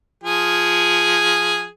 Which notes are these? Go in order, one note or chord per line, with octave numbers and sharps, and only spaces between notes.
F3 G#4